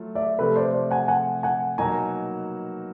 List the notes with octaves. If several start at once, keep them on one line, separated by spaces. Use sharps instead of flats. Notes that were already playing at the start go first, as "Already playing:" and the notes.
Already playing: F#3 A3 F4
D5 E5
C3 F3 A3 A4 B4
C5 D5
C5 D5
F#5 G#5
F#5 G#5
F#5 G#5
B2 F#3 A#3 D#4 F#4 G#5 A#5